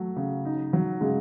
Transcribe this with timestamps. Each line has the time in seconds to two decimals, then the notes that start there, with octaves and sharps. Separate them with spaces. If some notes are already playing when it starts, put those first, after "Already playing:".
Already playing: F#3 A3
0.16 C#3
0.45 D#4
0.73 F#3
1.01 C#3 G#3